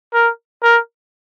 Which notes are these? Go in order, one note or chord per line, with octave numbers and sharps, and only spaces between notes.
A#4
A#4